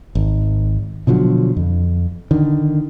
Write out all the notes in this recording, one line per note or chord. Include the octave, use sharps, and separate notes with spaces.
G#1
B2 D3 F3 F#3
F2
D3 D#3